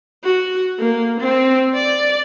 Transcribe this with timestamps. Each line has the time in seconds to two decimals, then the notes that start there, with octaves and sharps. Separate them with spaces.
0.24 F#4
0.79 A#3
1.20 C4
1.74 D5